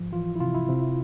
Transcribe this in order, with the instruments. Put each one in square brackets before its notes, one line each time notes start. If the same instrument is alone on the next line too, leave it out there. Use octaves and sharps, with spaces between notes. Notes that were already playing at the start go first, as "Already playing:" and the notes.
Already playing: [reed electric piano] G#2 F3
[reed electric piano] E3 [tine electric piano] F4
[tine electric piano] E4
[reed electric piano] C3 [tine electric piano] F4
[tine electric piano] E4
[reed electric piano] C3